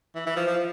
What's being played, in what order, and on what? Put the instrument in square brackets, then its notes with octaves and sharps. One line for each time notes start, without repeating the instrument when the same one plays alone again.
[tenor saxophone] E3
E3
F3
F3